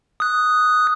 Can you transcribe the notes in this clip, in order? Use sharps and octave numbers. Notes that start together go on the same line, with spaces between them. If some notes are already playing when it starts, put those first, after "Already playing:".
D#6 F#6